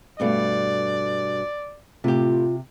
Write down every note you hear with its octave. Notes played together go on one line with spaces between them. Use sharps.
G2 B2 A3 D5
A2 C3 F4 G4